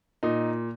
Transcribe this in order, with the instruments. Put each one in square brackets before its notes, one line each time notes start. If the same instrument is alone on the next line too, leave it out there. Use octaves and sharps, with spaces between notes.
[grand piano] A#2 D#4